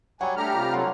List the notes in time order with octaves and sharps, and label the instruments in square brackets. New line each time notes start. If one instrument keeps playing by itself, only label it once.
[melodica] F#3 G3 C#5 [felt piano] F#5 [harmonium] G#5
[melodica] G3 [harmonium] A3 D4 A4 [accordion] G4 A#5 F6
[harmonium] C3 F4
[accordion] D3 F#3 [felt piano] F#5 C6